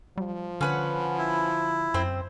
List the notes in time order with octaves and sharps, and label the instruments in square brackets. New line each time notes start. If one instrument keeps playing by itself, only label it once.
[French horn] F3 [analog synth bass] G3
[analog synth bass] D3 [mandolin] C#4 B4 F#5
[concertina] E4
[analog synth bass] F#2 [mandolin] C4 C5